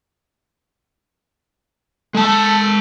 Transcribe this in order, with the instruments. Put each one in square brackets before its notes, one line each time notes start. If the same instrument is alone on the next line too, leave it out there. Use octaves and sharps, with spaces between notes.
[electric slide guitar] G#3 A5 [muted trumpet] A4